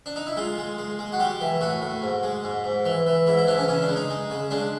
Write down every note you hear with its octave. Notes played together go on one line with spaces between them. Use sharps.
D4
D#4
E4
G#3 F4
G#3
G#3
G#3
F#4
G3 G4
E3
A2 F#4
A2
G#2
G#3
G#2
G#2
E3
E3
G#2 E4
E4
E3 D4
C#4
C#3 C#4
D4
G#3
D#4
G#3
C#3
G#3 D4